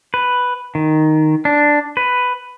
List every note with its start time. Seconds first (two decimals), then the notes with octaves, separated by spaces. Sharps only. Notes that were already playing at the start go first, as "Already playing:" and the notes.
0.14 B4
0.75 D#3
1.45 D4
1.97 B4